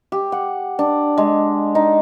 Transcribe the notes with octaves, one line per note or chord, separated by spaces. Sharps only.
G4
F#5
D4
G#3
D#4